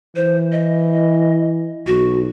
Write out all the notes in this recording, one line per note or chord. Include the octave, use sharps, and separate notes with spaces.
E3 C5
D#5
B1 F#4